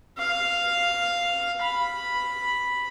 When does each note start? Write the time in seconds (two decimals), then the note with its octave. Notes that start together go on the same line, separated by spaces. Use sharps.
0.18 F5
1.62 B5